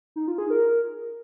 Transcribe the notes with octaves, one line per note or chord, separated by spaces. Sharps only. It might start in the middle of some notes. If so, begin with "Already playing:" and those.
D#4
F4
G#4
A#4